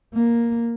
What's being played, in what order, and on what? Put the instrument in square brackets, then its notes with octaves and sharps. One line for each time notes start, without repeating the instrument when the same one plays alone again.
[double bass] A#3